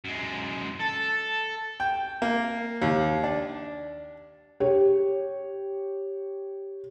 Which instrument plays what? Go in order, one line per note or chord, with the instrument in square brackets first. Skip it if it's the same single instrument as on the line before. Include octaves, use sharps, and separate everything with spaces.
[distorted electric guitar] F#2 G#3
[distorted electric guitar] A4 [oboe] A5
[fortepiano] G5
A#3
D#2
D4
[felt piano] G4 C#5